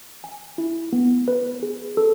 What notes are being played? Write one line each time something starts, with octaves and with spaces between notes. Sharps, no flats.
G#5
E4
B3
B4
G#4
A4